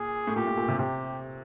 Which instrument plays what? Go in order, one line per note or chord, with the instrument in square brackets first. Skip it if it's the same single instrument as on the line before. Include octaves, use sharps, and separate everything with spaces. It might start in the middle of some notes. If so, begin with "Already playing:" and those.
Already playing: [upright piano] A#2 [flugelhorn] G#4
[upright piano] A2
[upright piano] A#2 [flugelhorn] G4
[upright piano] A2
A#2
C3
[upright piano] C3 [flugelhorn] G4